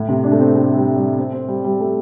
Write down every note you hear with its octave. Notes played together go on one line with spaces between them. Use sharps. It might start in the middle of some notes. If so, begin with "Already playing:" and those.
Already playing: A2
C3
D4
A3
C4
A3
G3
G3
C4
C4
G3
G3
A3